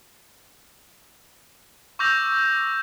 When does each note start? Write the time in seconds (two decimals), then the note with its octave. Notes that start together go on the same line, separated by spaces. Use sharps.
1.99 C#6 D6 E6 G6 A#6 F7